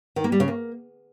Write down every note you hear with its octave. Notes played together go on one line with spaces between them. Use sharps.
D#3
A#3
G3
C#3
A#3